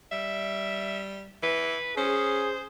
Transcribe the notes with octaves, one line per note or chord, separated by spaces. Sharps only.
G3 E5
E3 B4
C#4 G#4 C5